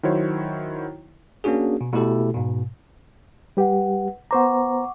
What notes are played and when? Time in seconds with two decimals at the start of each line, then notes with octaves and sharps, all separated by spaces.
0.03 D#3 F#3 E4 F#4 C5 C#5
1.44 A#3 C#4 D4 F#4 G#4
1.81 B2
1.93 B2 A3 E4 G4 A4
2.34 G#2 B2
3.57 G3 G4 B4 F#5
4.31 B3 C5 F#5 A#5 C#6 D6